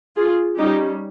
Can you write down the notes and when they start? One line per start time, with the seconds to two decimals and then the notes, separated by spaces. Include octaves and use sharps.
0.17 F4 G#4
0.57 G3 C#4 D#4 G4